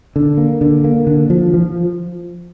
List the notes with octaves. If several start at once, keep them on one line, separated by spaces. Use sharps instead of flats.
D3
A#3
D3
A#3
D3
F3
F3